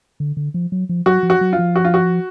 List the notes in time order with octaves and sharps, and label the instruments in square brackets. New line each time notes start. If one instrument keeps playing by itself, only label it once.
[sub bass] D3
D3
F3
F#3
F3
[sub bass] F#3 [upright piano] F#4
[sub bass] F3
[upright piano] F#4
[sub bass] F#3
[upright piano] F4
[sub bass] F3
[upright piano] F#4
F4
F#4